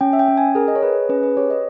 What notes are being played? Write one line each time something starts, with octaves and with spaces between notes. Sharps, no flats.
C#4 G5
E5
G5
C#4
G#5
G#4 A#4
D#5
C#5
G#4 B4
C#4 B4
B4
G4 C#5
D#5